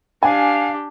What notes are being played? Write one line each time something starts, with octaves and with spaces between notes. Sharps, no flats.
D4 G4 F5 G#5